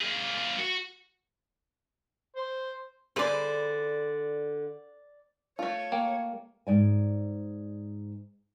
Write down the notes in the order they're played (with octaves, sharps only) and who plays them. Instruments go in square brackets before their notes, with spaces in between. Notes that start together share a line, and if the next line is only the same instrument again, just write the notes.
[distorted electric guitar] A#3 G#4
F#4
[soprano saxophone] C5
[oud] D3 G#4 B4 [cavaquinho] C5 D5
[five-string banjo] A3 F4 [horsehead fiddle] C#5
[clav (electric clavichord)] A#3 [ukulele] G5
[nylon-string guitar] G#2 D5 G#5